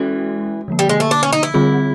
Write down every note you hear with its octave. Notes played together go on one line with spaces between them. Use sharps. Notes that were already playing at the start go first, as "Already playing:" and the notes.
Already playing: E3 G#3 C#4 F#4 A4
D3 F3 A#3
G3
G#3
A3
D4
C#4
D#4
E4
D3 G3 C4 F4 G#4